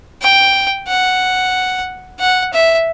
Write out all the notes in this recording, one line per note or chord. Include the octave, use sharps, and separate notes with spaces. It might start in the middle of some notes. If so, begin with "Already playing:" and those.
G5
F#5
F#5
E5